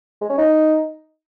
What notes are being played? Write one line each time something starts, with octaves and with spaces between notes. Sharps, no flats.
G#3
C#4
D#4